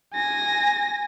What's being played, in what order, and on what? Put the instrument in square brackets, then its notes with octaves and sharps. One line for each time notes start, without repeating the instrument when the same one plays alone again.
[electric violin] G#5 A#6